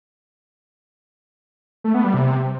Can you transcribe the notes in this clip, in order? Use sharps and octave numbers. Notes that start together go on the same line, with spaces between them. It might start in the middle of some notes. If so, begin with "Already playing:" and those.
A3
B3
G3
C3